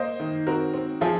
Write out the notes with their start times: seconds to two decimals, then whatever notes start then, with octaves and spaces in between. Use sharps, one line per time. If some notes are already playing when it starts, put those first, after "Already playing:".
Already playing: A#3 C5 D#5
0.20 D#3
0.47 C4 F#4 A#4
0.74 C4
1.01 F3 F4 G#4